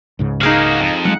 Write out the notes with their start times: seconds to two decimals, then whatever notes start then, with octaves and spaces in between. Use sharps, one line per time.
0.19 C#2 G#2 C#3
0.41 A#3 D#4 F#4 G#4 F5
0.80 F2
1.05 F#3 G#3 F#5